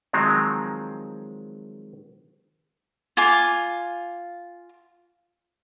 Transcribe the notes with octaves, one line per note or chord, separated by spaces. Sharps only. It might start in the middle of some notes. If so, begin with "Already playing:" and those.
D#3 F3 F#3 G#3 C4
F4 G#5 D6